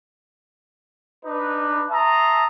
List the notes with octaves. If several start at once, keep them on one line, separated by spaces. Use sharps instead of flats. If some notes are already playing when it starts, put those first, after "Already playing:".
D4 D#4 B4
E5 A5 A#5 C6 D#6